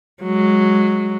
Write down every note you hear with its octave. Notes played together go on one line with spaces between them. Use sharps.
F#3 G#3